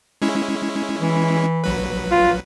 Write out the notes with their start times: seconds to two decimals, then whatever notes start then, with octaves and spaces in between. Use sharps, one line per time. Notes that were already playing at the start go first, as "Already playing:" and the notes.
0.22 G#3 C#4 E4
1.00 E3
1.64 A#1 F#3 B4
2.11 F4